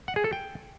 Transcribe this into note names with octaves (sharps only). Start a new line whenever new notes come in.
F#5
G#4
A4
G5